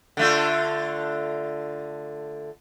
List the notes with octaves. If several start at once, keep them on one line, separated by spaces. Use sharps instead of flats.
D3 A3 F4